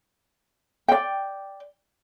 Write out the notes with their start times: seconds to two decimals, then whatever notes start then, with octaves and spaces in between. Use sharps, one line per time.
0.88 D5 G5